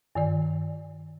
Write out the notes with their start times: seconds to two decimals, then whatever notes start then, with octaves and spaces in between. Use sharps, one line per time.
0.15 G2 D#3 D5